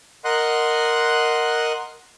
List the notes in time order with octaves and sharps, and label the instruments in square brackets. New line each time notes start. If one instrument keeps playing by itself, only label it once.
[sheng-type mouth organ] A#4 D#5 F#5 C6 F#6